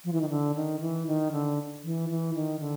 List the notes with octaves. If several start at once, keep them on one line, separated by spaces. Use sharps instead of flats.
F3
E3
D#3
D3
D#3
E3
D#3
D3
E3
E3
D#3
D3